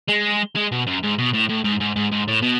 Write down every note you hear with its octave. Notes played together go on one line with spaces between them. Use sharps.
G#3
G#3
B2
F#2
G#2
B2
A2
A2
G#2
G#2
G#2
G#2
A2
B2